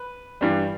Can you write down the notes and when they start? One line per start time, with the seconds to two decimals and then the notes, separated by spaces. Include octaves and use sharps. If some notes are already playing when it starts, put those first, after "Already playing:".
Already playing: B4
0.41 G2 E3 G3